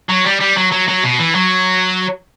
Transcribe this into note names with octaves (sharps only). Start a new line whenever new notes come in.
F#3
G3
G3
F#3
F#3
F#3
B2
E3
F#3